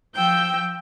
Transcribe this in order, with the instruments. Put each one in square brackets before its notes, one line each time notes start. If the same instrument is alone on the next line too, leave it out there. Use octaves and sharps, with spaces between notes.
[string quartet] F3 G5 [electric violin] E6 G6